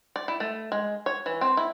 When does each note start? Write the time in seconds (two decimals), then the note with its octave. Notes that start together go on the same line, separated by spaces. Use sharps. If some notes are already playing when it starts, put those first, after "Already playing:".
0.16 D5
0.28 E4
0.40 A3
0.72 G#3
1.06 C#5
1.26 E3
1.41 C4
1.57 E4